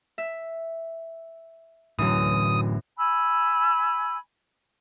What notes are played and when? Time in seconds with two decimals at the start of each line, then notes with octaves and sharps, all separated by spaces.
0.18 E5
1.99 F#2 A2 D3 E3 F#3 D#6
2.97 G#5 B5 E6